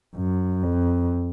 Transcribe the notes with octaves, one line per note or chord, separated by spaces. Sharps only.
F#2
F2